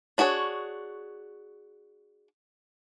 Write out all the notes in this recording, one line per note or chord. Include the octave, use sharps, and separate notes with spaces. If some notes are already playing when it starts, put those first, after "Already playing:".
D4 F#4 G#4 A4 C#5